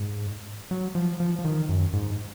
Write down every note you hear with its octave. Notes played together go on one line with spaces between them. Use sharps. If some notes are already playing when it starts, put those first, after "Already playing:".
Already playing: G#2
F#3
F3
F3
F3
D#3
F#2
G#2